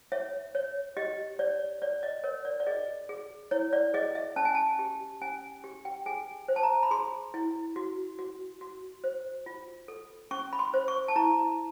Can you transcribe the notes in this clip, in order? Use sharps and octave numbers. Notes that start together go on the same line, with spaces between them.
C#5 E5
C#5
G4 D#5
C#5 D5
C#5 D5
D#5
A#4 C#5
D5
D5
G#4 D#5
G#4
E4 C#5
D5
G#4 D#5
E5
C#4 A5
G#5
A5
G4
C#4 G#5
G4
G5
G#4 G#5
C5
A5
A#5
B5
G#4 C6
E4
F#4
F#4
F#4
C5
F4
A4
C#4 C#6
B5
C6
C5
C#6
A5
E4 A#5